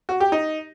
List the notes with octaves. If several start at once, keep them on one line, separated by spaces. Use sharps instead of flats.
F#4
G4
D#4